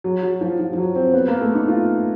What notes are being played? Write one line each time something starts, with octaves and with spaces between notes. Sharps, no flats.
F#3
F#3
F3
F3
F3
F#3
C4
B3
A#3
A3
D#4
F4